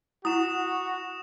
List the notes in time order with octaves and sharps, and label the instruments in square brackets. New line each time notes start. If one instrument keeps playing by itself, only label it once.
[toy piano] E4 F#5 [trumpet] F#4 [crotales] D#6 E7